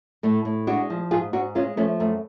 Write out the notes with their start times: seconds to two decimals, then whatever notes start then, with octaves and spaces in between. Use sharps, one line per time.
0.23 A2 A3
0.45 A2
0.67 G#3 D4 F#4
0.90 F3
1.11 G#2 F4 G#4
1.33 G#2 D4 F#4
1.55 G#3 C#4 F4
1.77 F3 A3 C#4
2.00 F#2 A3